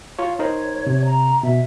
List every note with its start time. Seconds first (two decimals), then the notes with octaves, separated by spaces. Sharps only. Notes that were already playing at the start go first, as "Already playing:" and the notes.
0.19 F4 C#5
0.39 D#4 A#4 C5 C#5
0.87 C3
1.05 A#5
1.43 B2 E5